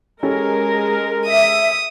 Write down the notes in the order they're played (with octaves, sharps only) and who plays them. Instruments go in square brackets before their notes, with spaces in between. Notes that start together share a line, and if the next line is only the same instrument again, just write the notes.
[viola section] G#3 A#4 [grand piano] C#4 G4 A4
[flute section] E5 [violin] D#6